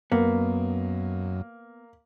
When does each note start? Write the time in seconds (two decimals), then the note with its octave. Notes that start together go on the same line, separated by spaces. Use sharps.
0.12 F#2 A#3 B3